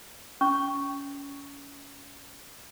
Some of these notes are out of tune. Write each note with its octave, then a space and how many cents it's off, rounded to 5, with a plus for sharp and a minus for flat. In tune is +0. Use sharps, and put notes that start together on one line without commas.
C#4 +25 C#6 +0